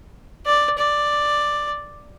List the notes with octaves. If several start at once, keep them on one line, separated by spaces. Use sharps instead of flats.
D5
D5